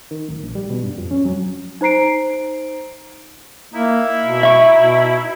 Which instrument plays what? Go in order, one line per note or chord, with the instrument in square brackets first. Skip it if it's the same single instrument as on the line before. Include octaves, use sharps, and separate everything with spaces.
[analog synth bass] D#3
D1
A#1
G3
B2
G2
F2
C#4
F#3
[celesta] D#4 C5 A#5 C7 D7
[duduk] A#3 [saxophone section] D#4 E4
[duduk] B2
[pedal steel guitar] E5 C#6
[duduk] B2